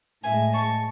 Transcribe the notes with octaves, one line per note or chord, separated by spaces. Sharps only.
A2 G#3 E5 G#5
A5 C#6